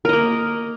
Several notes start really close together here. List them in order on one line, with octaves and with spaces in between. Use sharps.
A#4 D#5 A#3